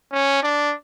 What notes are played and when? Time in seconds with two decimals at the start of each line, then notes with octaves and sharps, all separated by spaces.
0.12 C#4
0.43 D4